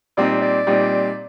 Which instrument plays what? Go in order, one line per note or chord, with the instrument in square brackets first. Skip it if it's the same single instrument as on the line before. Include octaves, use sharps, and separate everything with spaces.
[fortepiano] A#2 G3 C4 D#4 [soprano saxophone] D5
[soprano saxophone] D5
[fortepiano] A#2 G3 C4 D#4